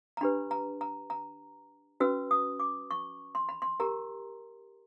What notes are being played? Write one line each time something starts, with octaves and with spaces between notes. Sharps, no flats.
A#5
D4 G4 B4 B5
A#5
A#5
A#5
C#4 F#4 B4 E6
D#6
D6
C#6
C6
B5
C6
G4 A#4 A#5